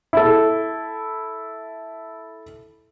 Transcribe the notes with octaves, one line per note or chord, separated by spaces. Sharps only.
E4 A4